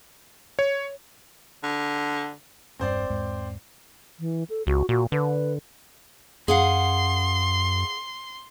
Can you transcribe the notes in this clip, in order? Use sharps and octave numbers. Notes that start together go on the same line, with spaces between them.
C#5
D3
E1 G2 G3 C4 C5 D5
E2 G#2 G#3
E3
A4
C#2 F#4
A#2 F#4
D3 B4
F#2 G#4 F5 F#5 C6